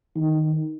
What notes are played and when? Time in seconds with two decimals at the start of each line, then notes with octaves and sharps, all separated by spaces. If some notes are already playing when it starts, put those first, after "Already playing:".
0.16 D#3